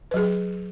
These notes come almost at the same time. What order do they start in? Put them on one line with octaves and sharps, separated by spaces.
B4 F#3 G#4